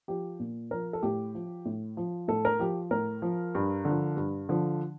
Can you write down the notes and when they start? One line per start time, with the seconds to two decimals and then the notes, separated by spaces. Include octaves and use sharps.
0.08 F3 G4
0.40 A#2
0.71 F3 A#4
0.93 A4
1.02 A2 G4
1.35 F3
1.65 A2
1.97 F3
2.28 A2 A4
2.45 A#4
2.59 F3 G4
2.91 A2 A#4
3.22 F3
3.55 G2
3.85 D3 F3
4.17 G2
4.49 D3 F3